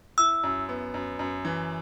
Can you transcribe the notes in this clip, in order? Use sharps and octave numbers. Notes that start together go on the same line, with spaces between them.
E4 E6
F#2
B3
F#2
F#2
E3